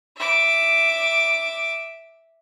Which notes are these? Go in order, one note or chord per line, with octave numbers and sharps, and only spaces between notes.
E5 D6